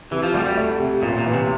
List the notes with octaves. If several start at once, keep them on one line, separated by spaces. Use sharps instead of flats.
C3 E3
F3
D2 G3
G3
A3
C3
A1 A#2
A#2
E3
C3